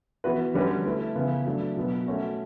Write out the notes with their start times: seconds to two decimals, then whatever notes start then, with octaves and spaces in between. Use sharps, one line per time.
0.24 E3 B3 F#4 B4
0.54 D3 G3 C#4 F#4 B4
0.85 A3 E4 B4
1.15 C#3 E3 B3 E4
1.45 F#3 A3 D4
1.77 B2 F#3 B3
2.07 A3 C#4 F#4